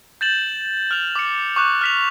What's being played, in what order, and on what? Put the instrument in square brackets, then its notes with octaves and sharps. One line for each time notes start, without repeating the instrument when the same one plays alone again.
[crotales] G6 A6 E7 F#7
F6 F7
D6 C#7
C#6 D6 F#6
F6 B6 F7